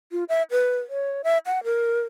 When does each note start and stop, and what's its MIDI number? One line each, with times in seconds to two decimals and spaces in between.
0.12 0.24 65
0.29 0.43 76
0.51 0.77 71
0.89 1.22 73
1.24 1.38 76
1.46 1.64 78
1.64 2.02 70